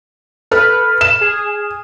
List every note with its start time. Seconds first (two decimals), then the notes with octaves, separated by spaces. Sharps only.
0.51 A4 B4 F6
1.01 E7
1.21 G#4